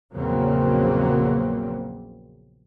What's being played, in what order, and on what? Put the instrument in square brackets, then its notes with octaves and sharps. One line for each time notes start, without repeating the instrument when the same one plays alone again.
[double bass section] A#1 E2 C#3 F#3 A#3 C4